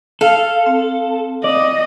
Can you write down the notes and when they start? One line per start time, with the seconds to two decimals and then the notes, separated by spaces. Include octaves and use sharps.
0.21 A4 F5
0.66 C4
1.44 D5 D#5